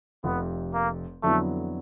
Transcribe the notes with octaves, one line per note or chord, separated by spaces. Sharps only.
F1 F2 C3 F3 B3
A#3
F2 D3 F#3 A3 B3 E4